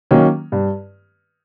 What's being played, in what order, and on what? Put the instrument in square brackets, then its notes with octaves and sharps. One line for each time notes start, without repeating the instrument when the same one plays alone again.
[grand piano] D#3 F#3 A#3 C#4
G2